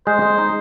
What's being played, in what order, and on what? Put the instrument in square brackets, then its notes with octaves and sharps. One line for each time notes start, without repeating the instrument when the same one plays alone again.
[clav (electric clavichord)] G#3 [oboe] C5
[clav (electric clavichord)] G#3
D#4